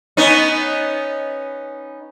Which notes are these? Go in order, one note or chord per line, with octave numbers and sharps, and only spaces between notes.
B3 C#4 D#4